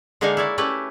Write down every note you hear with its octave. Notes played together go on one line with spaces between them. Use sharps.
D3 G#3 A#3 D#4 F5 G#5
E4 C#5 D5
A3 C#4 E4 G4 B4